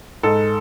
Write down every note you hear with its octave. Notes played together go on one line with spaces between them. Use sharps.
G#2 A4